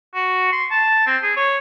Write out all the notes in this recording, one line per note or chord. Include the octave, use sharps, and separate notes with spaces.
F#4
C6
A5
C4
G#4
C#5